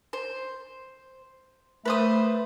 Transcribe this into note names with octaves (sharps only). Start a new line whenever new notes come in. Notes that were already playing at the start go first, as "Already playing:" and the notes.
C5
A3 B4 C5 D#6